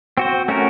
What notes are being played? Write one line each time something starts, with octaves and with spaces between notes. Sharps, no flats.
C4 F#4 C5
A3 C#4 F#4 A#4